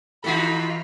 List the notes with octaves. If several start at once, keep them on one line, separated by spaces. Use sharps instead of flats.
E3 D#4 F4 F#4 A4 B5